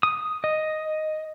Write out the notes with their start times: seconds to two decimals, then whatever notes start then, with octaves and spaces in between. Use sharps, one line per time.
0.03 D#6
0.44 D#5